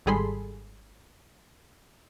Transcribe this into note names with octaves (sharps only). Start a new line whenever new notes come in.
G#1 G3 G#4 A4 B5 C6